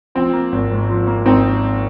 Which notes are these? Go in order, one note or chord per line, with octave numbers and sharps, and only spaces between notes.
F3 C4
A#3
G#1
G#2
F3
A#3
G#1 C4 D#4